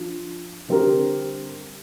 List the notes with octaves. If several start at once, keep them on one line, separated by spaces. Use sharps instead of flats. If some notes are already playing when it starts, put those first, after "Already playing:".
Already playing: F3 D4 F4
D3 G3 C4 G4 A#4